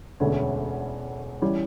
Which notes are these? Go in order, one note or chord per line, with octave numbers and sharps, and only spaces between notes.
E1 D2 D3 A3 C#4
E3 G3 C#4